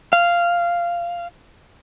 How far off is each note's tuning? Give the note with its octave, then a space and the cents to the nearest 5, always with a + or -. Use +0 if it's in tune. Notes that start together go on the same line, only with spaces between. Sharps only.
F5 -10